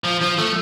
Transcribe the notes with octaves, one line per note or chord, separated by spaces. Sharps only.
F3
F3
A3